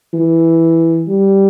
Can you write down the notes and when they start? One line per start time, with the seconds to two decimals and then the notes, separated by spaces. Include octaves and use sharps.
0.14 E3
1.08 G3